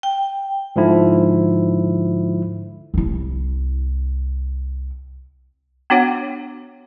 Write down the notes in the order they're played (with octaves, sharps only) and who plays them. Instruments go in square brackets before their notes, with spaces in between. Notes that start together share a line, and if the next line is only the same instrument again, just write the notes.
[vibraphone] G5
[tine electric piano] G#2 D3 F3 E4
[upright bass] C2 E4
[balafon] B3 D4 F#4 C#5 F#5